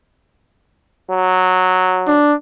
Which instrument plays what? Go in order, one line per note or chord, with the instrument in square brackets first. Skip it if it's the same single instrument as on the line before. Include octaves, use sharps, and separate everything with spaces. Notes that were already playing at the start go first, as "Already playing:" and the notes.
[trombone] F#3
[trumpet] D4